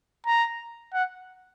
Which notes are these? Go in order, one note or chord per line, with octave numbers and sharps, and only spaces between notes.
A#5
F#5